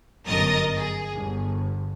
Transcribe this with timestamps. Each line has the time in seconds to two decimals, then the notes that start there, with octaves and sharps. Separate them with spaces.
0.26 G1 F#2 A#4 D#5 D#6 A6
0.75 G#4
1.15 G1